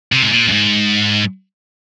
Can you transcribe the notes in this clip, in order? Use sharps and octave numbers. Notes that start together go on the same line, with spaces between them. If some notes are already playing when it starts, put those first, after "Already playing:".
C3
G#2
A#2
F#2
G#2